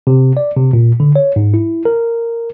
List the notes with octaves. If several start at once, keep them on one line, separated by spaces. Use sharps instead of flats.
C3
D5
C3
A#2
D3
C#5
G#2
E4
A#4